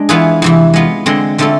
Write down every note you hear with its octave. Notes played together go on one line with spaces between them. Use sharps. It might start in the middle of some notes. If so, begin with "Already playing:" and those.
Already playing: G#3 D4
E3 B3 F4 G#4 B4
E2 C3 E3
G#3 B3 F4
D3 G#3 C4
D3 A3 C4 F4 A4